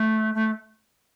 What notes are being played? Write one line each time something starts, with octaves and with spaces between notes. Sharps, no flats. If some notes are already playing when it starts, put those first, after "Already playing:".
Already playing: A3
A3